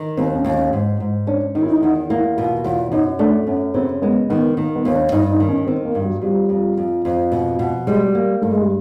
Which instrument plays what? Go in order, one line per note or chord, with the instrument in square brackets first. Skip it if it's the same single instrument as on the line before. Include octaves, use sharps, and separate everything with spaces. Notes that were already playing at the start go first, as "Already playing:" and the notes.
Already playing: [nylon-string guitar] D#3
[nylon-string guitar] D#2 [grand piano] C4
[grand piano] C#4
[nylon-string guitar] D#2
[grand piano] C#4
[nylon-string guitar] G#2
G#2
[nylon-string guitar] C#4 [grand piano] D4
[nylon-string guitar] D#3 [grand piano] D#4
[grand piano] E4
D#4
[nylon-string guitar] E2 [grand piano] D#4
[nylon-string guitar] A#3 [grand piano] E4
[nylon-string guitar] B2 [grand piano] F4
[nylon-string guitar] E2 [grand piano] F4
[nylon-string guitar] F#2 [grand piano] D#4
[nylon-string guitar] A3 [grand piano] D4
[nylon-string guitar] F#2 [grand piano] C#4
[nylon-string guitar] C#3 [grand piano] C4
[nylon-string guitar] G#3 [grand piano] B3
[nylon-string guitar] D#3 [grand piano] B3
[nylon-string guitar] D#3 [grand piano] A#3
[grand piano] B3
[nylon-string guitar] D#2
[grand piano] D4
[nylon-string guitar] G2 [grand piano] D#4
[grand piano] D#4
[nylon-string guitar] D#3
[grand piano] C#4
[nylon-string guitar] D#3 [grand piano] C4
[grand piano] A#3
[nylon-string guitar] G2
[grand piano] F#3
[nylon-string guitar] F2 [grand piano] G3
[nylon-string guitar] F2
F2
F2
B2
B2
[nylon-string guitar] G3 [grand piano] G#3
[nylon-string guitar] A#3
[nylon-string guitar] G2 [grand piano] A3
[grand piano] G#3
G3